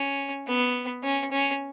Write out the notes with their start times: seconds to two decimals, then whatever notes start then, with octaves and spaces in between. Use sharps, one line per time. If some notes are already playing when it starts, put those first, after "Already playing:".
Already playing: C#4
0.47 B3
1.03 C#4
1.32 C#4